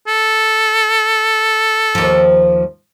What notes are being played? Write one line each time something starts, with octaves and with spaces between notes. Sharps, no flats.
A4
D#2 F3